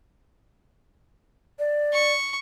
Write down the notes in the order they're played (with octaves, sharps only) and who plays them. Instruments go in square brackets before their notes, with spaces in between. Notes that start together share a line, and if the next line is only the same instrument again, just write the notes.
[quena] D5
[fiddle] C#6